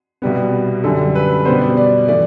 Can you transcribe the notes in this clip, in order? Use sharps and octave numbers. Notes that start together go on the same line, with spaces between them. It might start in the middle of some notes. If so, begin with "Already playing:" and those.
C2 B2 G3 B3
F#2 D3 G3 A4
B4
B2 G3 B3 C5
D5
D5
E3 A3 D5